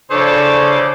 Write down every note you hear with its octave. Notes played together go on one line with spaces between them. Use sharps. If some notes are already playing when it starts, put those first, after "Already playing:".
C#3 E3 F3 D4 A4 C5 C#5 D6